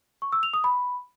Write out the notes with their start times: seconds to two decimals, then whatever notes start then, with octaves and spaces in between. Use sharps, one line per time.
0.22 C#6
0.32 E6
0.43 F7
0.53 D#6
0.64 B5